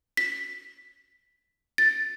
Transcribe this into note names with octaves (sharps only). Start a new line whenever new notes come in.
B6
A6